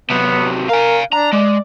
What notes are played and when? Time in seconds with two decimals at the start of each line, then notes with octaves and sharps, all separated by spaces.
0.10 C3 F#3 B3
0.69 A#4 F5 G#5
1.13 D4 A#5
1.33 G#3 D5